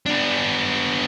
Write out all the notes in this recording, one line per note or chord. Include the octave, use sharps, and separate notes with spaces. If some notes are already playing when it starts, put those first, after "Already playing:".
B3 D4